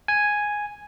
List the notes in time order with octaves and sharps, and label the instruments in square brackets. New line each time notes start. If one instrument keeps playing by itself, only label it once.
[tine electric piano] G#5